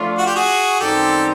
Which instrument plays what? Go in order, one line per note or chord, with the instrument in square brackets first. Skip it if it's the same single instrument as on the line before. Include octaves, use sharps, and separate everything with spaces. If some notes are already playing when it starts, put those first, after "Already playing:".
Already playing: [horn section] F3 A3 D4 F4
[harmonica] F#4
G4
F#4 G#4
[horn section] F#2 D#3 G3 C4 D#4 [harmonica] G4 A4